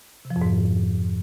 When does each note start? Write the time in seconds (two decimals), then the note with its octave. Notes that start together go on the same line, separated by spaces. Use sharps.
0.25 C3
0.30 F3
0.36 F2
0.42 G#2